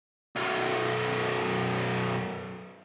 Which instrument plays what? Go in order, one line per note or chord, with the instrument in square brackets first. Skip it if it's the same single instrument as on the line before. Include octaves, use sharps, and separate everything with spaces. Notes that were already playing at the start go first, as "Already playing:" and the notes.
[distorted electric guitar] B1 F#2